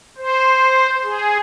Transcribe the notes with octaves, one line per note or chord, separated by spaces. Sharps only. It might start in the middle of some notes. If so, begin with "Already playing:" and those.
C5
G#4